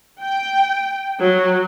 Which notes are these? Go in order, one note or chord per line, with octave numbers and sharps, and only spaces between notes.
G5
F#3